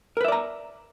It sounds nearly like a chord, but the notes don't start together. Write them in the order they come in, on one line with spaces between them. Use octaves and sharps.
A#4 B4 E5 D5 A#5